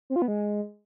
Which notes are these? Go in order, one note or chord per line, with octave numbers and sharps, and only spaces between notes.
C4
F4
B3
G#3